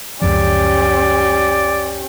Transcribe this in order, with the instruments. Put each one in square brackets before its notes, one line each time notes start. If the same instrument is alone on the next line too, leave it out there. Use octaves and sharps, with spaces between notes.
[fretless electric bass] C#2 F#2 F3 [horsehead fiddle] C#4 G4 [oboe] D5